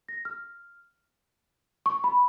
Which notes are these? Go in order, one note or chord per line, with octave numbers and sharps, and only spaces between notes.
A#6
F6
C#6
B5